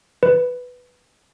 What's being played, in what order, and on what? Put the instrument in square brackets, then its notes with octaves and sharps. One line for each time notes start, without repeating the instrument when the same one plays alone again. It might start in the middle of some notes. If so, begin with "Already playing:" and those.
[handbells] B4